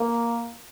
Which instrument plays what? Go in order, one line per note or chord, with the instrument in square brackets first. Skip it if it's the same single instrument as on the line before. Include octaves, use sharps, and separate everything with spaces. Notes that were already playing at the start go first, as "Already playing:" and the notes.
Already playing: [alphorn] A#3